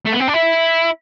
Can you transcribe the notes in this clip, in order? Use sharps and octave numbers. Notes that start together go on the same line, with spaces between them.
A3
B3
C4
D4
E4